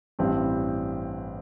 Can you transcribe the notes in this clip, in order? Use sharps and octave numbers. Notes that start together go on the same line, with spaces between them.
A1 G2 G3 C4